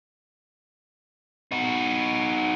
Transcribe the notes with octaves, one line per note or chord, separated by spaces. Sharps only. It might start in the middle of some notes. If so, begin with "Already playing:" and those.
D#4 F#4